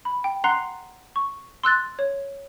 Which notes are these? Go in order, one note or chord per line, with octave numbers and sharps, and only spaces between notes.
B5
G5
F#5 A#5 C6 F#6 C7
C#6
C6 E6 F#6 A6
C#5